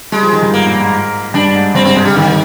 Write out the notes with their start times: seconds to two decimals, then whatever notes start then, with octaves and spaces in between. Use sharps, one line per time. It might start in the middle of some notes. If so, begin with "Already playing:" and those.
0.12 G3 G#3
0.23 F3
0.32 D#3
0.42 G2
0.53 G#2 A#3
0.66 A#2
0.80 G#2
1.34 G2 D4
1.55 G#2
1.75 G2 C4
1.85 G#2 C4
1.95 C3 G#3
2.05 D3 G3
2.16 D3 D#3